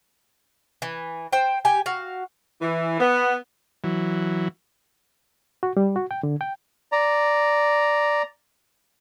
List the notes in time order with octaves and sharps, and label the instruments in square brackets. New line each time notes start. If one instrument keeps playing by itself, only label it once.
[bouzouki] E3
C5 G5
G4 G5 G#5
F#4 F5
[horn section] E3
B3
[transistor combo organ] E3 F#3
[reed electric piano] F#4
G3
F#4
G5
D3
G5
[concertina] D5 A#5